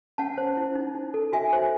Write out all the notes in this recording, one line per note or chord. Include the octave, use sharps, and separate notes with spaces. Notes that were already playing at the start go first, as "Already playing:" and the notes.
C#4 F#5 A5
C5
E4
D#4
D#4
A4
F#4 E5 G#5
C5